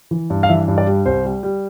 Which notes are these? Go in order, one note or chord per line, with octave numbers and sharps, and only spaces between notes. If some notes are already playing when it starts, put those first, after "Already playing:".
E3
G2
F5
E3 E5
G2
D5
G3
C2 C5
G3
G3